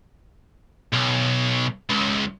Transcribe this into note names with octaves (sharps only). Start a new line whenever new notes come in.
B1
C#2